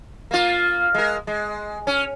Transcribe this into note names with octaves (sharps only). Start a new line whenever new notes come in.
A#3 F4
G#3 A#4
G#3
C#4